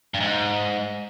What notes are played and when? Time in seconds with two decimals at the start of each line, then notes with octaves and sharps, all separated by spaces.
0.14 G2
0.20 G#2